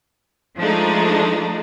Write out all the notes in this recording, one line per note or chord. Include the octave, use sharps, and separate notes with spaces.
F3 G#3 A3 D4 D#4